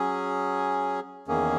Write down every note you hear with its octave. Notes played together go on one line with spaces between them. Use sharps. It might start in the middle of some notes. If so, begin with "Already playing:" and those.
Already playing: F#3 C#4 G#4
E2 D#3 A#3 C#4 G#4